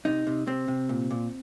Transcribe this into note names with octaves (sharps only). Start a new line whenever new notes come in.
C3 D#4
C3
C3 C4
C3
A#2
A#2